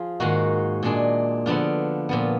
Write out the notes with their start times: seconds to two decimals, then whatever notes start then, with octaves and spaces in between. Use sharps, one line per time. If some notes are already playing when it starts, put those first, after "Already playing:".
Already playing: F3 F4 G#4
0.20 G#2 D#3 A#3 D#4 F#4
0.83 A#2 G#3 D4 G#4
1.46 D3 F3 B3 D4 F4
2.09 A#2 F3 B3